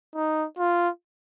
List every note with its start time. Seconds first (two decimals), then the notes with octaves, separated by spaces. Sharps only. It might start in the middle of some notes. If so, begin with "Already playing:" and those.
0.15 D#4
0.58 F4